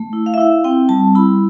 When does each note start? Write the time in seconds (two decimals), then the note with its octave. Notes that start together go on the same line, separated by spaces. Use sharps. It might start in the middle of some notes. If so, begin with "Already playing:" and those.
Already playing: A3
0.13 E4
0.26 F5
0.34 E5
0.38 E4 F5
0.64 C4 G5
0.89 G3 A5
1.15 E4 B5